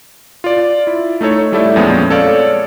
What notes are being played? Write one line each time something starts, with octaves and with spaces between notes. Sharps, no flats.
F4 D5
E4
A3 D#4 A4 C#5
G3 A3 E4 A4 D5 E5
F2 A#2 F3 G#3 B3 C#4
A4 C#5 D5 F5